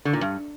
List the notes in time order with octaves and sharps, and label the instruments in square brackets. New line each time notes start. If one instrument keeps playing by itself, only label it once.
[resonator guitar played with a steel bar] D3
A#2
G2